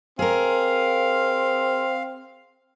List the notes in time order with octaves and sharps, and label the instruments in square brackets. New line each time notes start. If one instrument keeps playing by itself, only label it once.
[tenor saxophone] C4 [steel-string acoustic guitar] G#4 A#4 [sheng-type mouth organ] F5